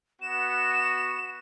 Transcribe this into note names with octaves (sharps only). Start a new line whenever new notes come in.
B3 F#4 E7